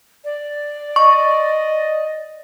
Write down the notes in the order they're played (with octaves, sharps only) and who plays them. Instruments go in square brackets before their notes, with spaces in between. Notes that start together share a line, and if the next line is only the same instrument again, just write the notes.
[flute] D5
[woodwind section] D#5 [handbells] C#6